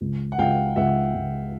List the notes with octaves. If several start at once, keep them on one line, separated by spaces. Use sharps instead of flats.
C#2
F#5
C#2 F5 G5
C#2 E5 F#5
C#2